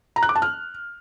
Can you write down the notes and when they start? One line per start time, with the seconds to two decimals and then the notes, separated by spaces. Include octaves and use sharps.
0.16 A#5
0.23 F#6
0.29 D6
0.36 A5
0.42 F6